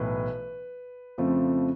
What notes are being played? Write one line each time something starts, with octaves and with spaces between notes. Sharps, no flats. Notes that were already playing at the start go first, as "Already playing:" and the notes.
Already playing: B1 A2 E3 B4
F2 C#3 F3 A3 C4